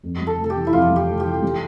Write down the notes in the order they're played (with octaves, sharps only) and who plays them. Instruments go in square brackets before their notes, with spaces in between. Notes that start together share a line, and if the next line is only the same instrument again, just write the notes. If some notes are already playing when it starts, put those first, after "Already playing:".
[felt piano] F2
G3
[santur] A4
[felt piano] F1
[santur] A4
G4
[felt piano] E3
[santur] E4
[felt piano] F2 [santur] F4
[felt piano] G3
[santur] G4
[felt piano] F1
[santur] G4
[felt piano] E3
G3